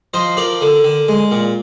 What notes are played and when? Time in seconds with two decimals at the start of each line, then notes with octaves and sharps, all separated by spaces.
0.14 F3 C5 D#5
0.37 F3 A#4 D5
0.61 D3
0.84 D3
1.08 G#3
1.31 A#2